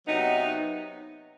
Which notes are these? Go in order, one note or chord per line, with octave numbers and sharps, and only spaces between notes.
C3 F#3 B3 D#4